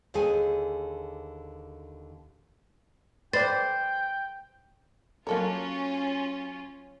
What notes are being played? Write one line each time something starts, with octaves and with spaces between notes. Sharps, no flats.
D#2 D3 G#4 G#5
B4 C5 D5 G5 A6
F#3 A#3 C#4 F4 A4 A#4 C#5